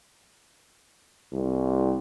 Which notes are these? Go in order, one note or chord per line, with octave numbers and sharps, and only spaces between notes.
C2